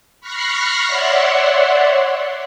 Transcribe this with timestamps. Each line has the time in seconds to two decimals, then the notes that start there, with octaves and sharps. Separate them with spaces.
0.21 B5 C#6 F6 F#6 A#6 C7
0.86 C#5 D5 E5 F#5 C6